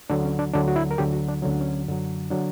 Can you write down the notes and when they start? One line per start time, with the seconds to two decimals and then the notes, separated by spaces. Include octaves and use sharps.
0.10 D2 D3 F#3 D4
0.25 C#4
0.39 D4
0.54 D2 D3 F#3 D4
0.68 F#4
0.76 E4
0.91 A#4
0.98 D2 D3 F#3 G4
1.12 F#4
1.28 D4
1.42 D2 D3 F#3 C#4
1.51 D4
1.60 C#4
1.87 F#2 D3 F#3
2.30 D3 F#3 D4